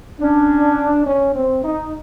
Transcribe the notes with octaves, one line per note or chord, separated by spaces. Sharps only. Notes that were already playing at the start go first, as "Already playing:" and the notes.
C#4 D4
C#4
C4
D#4